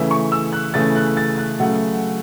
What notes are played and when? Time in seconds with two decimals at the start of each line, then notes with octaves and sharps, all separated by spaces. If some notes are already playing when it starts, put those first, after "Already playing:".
Already playing: C#3 E3 A3 E5
0.11 C#6
0.32 E6
0.53 F#6
0.74 C#3 E3 A3 A6
0.96 F#6
1.17 A6
1.38 F#6
1.59 C#3 F#3 A3 F#5